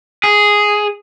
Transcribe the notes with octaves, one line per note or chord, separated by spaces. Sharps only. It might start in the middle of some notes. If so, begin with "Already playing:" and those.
G#4